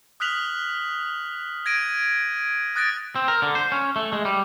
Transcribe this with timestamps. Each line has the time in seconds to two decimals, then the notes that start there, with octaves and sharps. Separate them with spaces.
0.20 D#6 F6 F#6 B6 F7 F#7
1.66 G#6 A#6 D7 D#7
2.76 D#6 F#6 A6 A#6 D7
3.16 C4
3.28 A#4
3.42 D3
3.55 C5
3.72 C#4
3.96 A3
4.13 G#3
4.25 G3